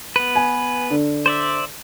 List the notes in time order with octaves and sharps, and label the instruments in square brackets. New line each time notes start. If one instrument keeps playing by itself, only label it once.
[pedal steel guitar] B3 B4
[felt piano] G#5
D3
[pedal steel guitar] C5 D5 E5